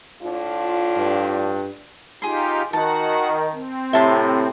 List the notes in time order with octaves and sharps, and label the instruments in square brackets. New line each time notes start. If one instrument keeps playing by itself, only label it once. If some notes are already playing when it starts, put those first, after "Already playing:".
[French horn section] A2 D4 F4
[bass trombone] G2
[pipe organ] D#4 F4 G4 [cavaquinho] G#4 C6
[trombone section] D#3 [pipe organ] F#4 F#5 [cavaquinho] A5
[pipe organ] C4
[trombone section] A2 C3 [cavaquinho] E5 A5 C6